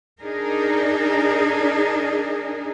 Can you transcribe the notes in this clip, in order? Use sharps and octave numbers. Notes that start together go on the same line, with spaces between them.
D4 D#4 G#4 A#4